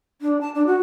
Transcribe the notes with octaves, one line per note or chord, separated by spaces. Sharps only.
D4
A5
D4
F#4